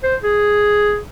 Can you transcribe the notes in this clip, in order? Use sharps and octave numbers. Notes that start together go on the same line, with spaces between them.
C5
G#4